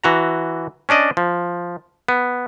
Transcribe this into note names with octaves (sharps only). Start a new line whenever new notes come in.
E3 F#4 A#5
C#4 D4 D5 D#5
F3
B3